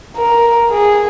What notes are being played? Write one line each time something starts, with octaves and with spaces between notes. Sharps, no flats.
A#4
G#4